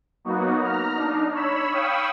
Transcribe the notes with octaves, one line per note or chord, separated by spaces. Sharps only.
F#3 A#3 B3 D#4 F#4
A#5 F6
D4 D#4
C#5 B5 E6
F5 G5 B5 C#6 D#6 E6